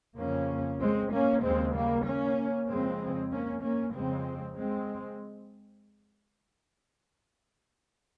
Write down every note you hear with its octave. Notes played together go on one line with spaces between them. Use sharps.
F2 C#3 A#3 C#4
G#3 C4
A#3 C#4
D#2 C#3 G#3 C4
G3 A#3
A#3 C#4
F2 C#3 G#3 C4
A#3 C#4
A#3 C#4
F2 C#3 G#3 C4
G#3 C4